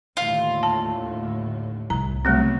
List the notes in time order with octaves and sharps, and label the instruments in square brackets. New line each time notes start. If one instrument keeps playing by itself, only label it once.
[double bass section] D#2 A2 D3 [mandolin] F4
[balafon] A5
[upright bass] C2 [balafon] A#5
[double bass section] C#3 F#3 B3 [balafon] G3 A3 C4